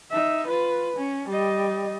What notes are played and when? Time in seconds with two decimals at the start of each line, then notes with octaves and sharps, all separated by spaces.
0.10 D#4 E5
0.47 F4 B4
0.96 C#4
1.29 G3 D#5